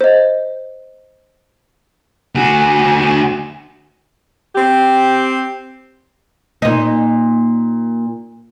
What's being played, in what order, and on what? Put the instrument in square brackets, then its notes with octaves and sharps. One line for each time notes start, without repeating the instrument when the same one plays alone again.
[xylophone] C5 D#5
[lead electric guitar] D2 F#4 [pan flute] G#5
[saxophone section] C4 G4
[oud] A#2 D#4